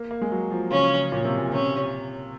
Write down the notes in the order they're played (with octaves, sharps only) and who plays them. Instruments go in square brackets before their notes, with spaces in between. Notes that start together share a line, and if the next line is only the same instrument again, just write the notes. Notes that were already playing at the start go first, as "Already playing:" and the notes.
Already playing: [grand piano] A#3
A#3
G#3
F#3
F3
[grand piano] C#3 [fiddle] C#4
[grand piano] A#2
C3
A#2
[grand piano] C3 [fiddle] C#4